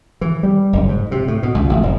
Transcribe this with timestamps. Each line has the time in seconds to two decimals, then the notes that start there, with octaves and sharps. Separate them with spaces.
0.21 E3
0.43 G3
0.73 F#1
0.89 G#2
1.11 C3
1.28 A2
1.43 B2
1.55 C#2
1.70 A1
1.83 F1